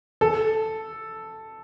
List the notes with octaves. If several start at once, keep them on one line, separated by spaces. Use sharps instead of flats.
A4